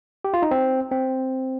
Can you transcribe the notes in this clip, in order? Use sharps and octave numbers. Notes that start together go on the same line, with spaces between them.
G4
F4
D#4
C4
C4